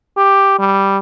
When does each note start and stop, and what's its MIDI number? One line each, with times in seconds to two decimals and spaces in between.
0.17 0.57 67
0.59 0.98 55